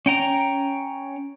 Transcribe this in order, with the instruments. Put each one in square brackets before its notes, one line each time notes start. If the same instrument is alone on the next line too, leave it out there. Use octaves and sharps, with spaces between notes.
[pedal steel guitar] C#4 G5 A#5